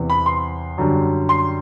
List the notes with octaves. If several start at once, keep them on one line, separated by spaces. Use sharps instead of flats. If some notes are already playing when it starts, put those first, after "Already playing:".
Already playing: E2 C3 E3
B5
C6
F#2 D3 G3
C6